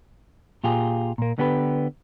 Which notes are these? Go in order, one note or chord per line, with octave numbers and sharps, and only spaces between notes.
A#2 F4 G4 G#4
A#2 A#3
D3 B3 G4 A#4 B4